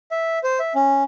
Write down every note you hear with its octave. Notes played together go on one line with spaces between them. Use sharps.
E5
C5
E5
C#4